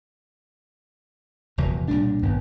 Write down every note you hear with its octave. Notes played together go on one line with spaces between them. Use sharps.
F1 E2 A#2 F#3
B1 A#2 G3 D4
G#1 G2 D#3 B3